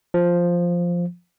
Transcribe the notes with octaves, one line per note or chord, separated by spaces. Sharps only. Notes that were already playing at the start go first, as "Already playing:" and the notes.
F3